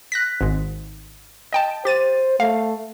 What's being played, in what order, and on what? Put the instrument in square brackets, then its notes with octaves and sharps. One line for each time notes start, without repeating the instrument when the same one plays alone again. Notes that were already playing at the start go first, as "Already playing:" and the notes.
[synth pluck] F#6 A#6 B6
G#1 G#2
D#5 G5 A5
[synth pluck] G4 A6 D#7 [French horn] C5
[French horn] A3 [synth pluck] F5